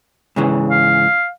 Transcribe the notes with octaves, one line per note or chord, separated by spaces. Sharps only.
G#2 C#3 E3
F5